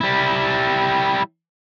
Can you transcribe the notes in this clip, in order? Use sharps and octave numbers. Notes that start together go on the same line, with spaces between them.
G3 E4